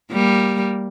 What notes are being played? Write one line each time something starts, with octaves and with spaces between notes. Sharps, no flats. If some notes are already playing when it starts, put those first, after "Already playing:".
G3 A#3